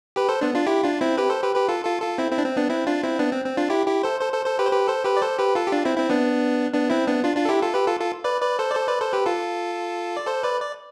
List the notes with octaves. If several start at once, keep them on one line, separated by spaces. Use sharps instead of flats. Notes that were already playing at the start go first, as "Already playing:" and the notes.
G4 B4
A4 C5
B3 D4
D4 F4
E4 G4
D4 F4
C4 E4
G4 B4
A4 C5
G4 B4
G4 B4
F4 A4
F4 A4
F4 A4
C4 E4
C4 E4
D4
C4
B3 D4
C4 E4
D4 F4
C4 E4
B3 D4
C4
C4
D4 F4
E4 G4
E4 G4
A4 C5
A4 C5
A4 C5
A4 C5
G4 B4
C5
G4 B4
A4 C5
G4 B4
D5
A4 C5
G4 B4
F4 A4
G4
D4 F4
C4 E4
C4 E4
B3 D4
B3 D4
C4 E4
B3 D4
D4 F4
D4 F4
A4
E4 G4
F4 A4
G4 B4
F4 A4
F4 A4
B4 D5
B4 D5
A4 C5
D5
A4 C5
B4 D5
A4 C5
G4 B4
F4 A4
D5
A4 C5
B4 D5
D5